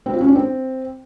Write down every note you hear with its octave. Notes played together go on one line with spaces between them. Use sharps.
C4
F4
C#4
D4
C4